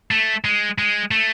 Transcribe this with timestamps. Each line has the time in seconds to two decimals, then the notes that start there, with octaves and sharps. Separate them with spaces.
0.11 A3
0.44 G#3
0.78 G#3
1.11 A3